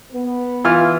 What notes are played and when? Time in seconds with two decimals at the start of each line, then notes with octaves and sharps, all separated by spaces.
0.12 B3
0.65 E3 F4 F6